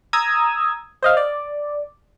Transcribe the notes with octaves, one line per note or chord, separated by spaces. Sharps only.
A#5 D#6 E6 G#6
C5 D#5 F5
D5